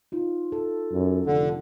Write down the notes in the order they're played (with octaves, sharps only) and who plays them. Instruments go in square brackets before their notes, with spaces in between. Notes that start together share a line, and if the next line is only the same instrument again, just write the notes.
[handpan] D#4 F4
A4
[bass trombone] F#2
[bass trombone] F1 [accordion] D3